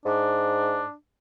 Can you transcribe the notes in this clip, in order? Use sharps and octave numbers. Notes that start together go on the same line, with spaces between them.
G#2 D4